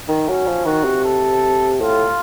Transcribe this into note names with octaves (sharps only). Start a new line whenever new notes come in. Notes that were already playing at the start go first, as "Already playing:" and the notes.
D#3
F#3 C#4
F3
D#3 F#4
C3
A4
A2 F4